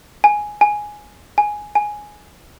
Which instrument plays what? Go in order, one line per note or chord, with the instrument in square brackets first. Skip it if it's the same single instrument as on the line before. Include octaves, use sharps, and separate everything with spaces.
[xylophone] G#5
G#5
G#5
G#5